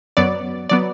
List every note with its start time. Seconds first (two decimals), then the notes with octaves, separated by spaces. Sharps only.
0.17 F#2 F#3 B3 D5
0.69 F#3 B3 D5